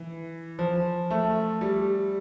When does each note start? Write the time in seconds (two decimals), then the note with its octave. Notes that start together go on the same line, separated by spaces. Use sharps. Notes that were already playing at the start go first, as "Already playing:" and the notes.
Already playing: E3
0.59 F3
1.11 A3
1.61 G3